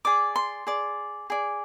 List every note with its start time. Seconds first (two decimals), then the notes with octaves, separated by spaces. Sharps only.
0.05 G#4 D5 D6
0.36 C6
0.67 G#4 D5
1.30 G#4 D5